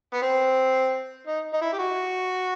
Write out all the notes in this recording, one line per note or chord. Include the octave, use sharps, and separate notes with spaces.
B3
C4
D#4
D#4
E4
G4
F#4